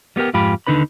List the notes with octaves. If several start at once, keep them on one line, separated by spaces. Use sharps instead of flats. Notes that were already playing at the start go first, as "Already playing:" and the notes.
G3 B3 G4 A#4 G5
F2 G#2 F4 G4 B5
D#2 D3 D#4 B4 B5